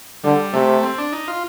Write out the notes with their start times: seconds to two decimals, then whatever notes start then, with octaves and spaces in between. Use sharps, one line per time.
0.24 D3 G3
0.54 C3 A3
0.83 C4
0.98 D4
1.13 D#4
1.28 F4